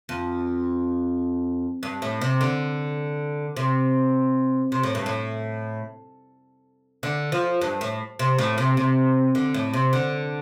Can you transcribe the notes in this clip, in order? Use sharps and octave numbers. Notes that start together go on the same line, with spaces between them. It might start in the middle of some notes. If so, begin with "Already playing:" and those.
F2
G2
A2
C3
D3
C3
C3
A2
G2
A2
D3
F3
G2
A2
C3
A2
C3
C3
D3
A2
C3
D3